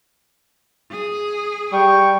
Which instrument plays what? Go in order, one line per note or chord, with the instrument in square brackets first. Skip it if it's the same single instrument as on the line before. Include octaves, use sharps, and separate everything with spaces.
[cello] G#4
[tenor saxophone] G3 [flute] G5 [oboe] C#6